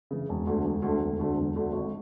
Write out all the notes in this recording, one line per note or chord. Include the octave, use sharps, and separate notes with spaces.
C#3 E3
E1
D2 D3 A3
E1
D2 D3 A3
E1
D2 D3 A3
E1
D2 D3 A3
G#1